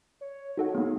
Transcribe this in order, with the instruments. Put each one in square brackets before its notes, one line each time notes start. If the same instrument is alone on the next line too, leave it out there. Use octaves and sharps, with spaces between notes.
[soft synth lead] C#5
[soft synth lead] D#4 [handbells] F#4 A4 F#5
[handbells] A#3 B3 [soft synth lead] G#4